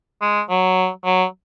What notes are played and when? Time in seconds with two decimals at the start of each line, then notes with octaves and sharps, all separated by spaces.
0.22 G#3
0.50 F#3
1.05 F#3